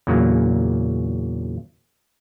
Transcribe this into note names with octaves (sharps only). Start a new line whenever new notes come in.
E2 A#2 C#3 F#3 A#3